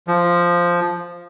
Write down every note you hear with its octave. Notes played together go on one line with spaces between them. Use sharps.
F3